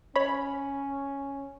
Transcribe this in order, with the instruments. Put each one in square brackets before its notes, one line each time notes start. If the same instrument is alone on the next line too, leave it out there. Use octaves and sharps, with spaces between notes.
[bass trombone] C#4 [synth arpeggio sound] C#5 B5